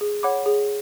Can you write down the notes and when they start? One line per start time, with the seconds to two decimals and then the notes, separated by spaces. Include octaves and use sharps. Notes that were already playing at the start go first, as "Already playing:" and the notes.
0.01 G#4
0.23 C#5 F#5 B5 D6
0.46 G#4